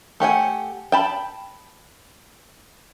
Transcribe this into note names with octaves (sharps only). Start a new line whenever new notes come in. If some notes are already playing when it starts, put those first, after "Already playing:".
A3 G4 F#5 G#5
G5 A5 B5